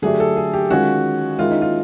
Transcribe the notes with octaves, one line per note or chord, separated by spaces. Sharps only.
D3 F#3 A3 D4 G4 G#4
A4
G#4
G4
D#3 G#3 C#4 F4 F#4
D#3 G#3 C#4 E4 F4
D#4
F4